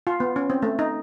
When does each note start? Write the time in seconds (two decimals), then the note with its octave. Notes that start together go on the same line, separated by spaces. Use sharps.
0.07 F4
0.20 B3
0.36 C#4
0.50 C4
0.62 A3
0.79 D#4